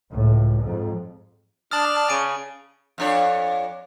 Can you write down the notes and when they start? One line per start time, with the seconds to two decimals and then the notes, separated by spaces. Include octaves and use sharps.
0.12 C#2 A2
0.62 F2 G#2
1.71 D4 A5 D#6 F6 A6 F#7
2.09 C#3 G#5 D7 D#7
2.98 F2 D4 C#5